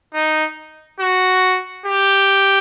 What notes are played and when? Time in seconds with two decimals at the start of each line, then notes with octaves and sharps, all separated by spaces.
0.14 D#4
1.00 F#4
1.86 G4